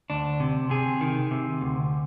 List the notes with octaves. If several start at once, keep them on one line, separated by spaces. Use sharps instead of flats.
D2 D4
C3
C3 G#4
D#3
C3
D2